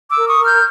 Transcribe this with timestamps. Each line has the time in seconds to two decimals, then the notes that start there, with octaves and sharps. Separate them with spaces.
0.09 D6 E6
0.16 A#4
0.27 C#6 D#6
0.39 A#4
0.44 F6 G6